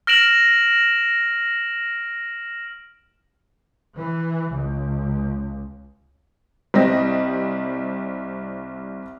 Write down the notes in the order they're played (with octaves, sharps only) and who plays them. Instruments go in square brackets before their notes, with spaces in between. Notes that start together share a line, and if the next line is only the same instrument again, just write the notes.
[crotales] F6 A#6 D7 E7 F#7
[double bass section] E3
C#2
[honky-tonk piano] C2 G3 C4 D#5 A#6